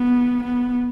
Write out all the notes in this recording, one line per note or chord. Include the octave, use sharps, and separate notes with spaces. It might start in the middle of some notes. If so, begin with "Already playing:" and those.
Already playing: B3
B3